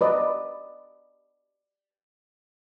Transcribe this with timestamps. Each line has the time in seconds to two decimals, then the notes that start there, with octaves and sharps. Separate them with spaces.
0.01 B4 D5 D#5